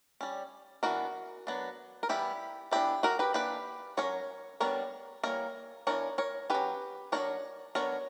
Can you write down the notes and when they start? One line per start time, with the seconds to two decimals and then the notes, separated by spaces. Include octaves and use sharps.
0.21 G3 C#4
0.83 E3 B3 D4 F#4 A#4
1.47 F#3 B3 D4
2.03 A#4
2.09 E3 G3 B3 E4 G4
2.71 E3 B3 D4 E4 G4
3.03 F#4 A#4
3.19 G4 B4
3.34 E3 A#3 D4 G4 B4
3.97 F#3 C#4 A#4 C#5
4.60 G3 B3 D4 A#4 C#5
5.24 E3 G3 A#3 A#4 C#5
5.87 E3 B3 D4 A#4 C#5
6.18 A#4 C#5
6.50 F#3 C#4 G4 B4
7.12 F#3 A#3 D4 A#4 C#5
7.75 F#3 B3 D4 A#4 C#5